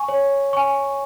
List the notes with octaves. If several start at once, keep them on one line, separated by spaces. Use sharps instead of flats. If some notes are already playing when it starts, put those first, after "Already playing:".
Already playing: G#5 C#6
C#5
G#5 C#6